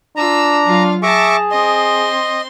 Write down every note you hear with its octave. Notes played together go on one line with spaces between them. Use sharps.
D4 F4 A#5 E6
F#3 F4 F5
G#4 E5 A5 C#6 D6 A#6
C4 D#5 C6